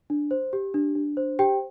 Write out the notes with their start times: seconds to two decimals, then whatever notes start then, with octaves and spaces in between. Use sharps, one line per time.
0.10 D4
0.31 C5
0.53 G4
0.74 D4
0.95 D4
1.17 C5
1.39 G4 G5